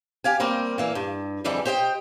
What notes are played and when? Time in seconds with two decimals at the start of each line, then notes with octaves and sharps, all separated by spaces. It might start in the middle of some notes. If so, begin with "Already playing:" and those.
0.24 G4 F5 G#5
0.40 G3 A#3 C4 A#4
0.78 A#2 E3 A#3
0.95 G2
1.44 F2 D3 E3 G3 G#3
1.65 G4 C5 D#5 E5 G5